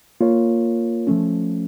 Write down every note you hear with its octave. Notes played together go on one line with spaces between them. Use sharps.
A#3 F4 A#4 C#5
F3 A3 C#4